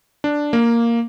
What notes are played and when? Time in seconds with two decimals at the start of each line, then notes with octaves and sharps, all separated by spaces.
0.24 D4
0.53 A#3